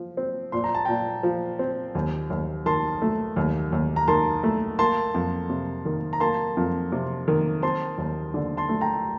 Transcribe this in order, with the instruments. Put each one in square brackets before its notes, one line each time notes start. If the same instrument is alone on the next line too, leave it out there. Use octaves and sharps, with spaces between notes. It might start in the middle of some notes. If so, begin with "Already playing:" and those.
Already playing: [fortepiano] F3
C4
[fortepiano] A#2 [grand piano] C6
[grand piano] A#5
A5
[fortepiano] A#2 [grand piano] G5 A#5
[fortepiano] F3
C4
D#2
D#2
[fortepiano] D#3 [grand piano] A5 C6
[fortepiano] A3
D#2
D#2
[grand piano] A#5
[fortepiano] D#3 [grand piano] A5 C6
[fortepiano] A3
[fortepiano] A#3 [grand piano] A5 C6
[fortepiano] F2
C3
D#3
[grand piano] A#5
[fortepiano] A#3 [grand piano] A5 C6
[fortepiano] F2
C3
D#3
[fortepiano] C4 [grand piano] A5 C6
[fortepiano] D#2
D3
[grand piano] A5 C6
[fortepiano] A3
[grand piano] G5 A#5